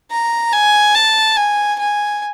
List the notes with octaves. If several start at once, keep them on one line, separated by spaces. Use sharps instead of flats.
A#5
G#5
A5
G#5
G#5